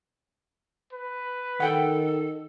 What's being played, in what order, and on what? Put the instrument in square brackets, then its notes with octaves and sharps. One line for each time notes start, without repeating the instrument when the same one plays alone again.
[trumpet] B4
[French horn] D#3 [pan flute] A4 [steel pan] F#5 G5